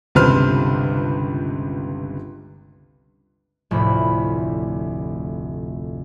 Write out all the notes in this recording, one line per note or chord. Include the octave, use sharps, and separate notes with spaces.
G1 C#2 C3 B4 C5 F6
F1 D2 A2 B5